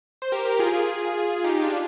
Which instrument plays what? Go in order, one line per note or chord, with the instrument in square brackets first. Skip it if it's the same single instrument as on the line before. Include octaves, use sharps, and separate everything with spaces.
[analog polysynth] C5
G4 A#4
G4 A#4
F4 G#4
F4 G#4
D#4 G4
D4 F4